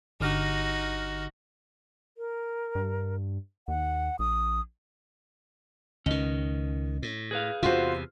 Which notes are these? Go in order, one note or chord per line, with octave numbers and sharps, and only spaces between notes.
G1 D3 D#4 F#4 F6
A#4
G2
D#2 F#5
A#1 D#6
C#2 D#3 C#4 D#5
A2
G#4 B4 F5
E2 C3 F4 F#4 C5